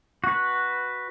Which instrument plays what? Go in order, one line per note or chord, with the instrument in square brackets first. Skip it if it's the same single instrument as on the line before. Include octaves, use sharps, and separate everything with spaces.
[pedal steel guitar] F#4 B4